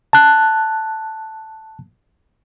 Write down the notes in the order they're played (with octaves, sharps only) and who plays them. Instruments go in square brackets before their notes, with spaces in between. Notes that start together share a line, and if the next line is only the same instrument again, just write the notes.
[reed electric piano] A5 F#6